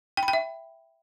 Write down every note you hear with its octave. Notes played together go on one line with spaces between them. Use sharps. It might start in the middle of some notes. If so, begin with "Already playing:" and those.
G5
B5
G5
E5